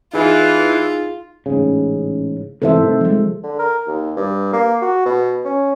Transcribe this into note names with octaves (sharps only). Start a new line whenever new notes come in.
E3 D#4 F4 G#4
A1 G#2 C#3
G#2 C3 E3 A4 C5 E5
C3 D#3 A3
F3 G#3
D3
A#4
D#2
G2
A#3
F#4
B2
C#4